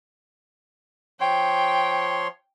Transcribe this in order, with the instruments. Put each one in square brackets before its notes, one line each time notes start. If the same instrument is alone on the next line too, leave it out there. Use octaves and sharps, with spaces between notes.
[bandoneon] F3 C#5 C6 [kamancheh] G5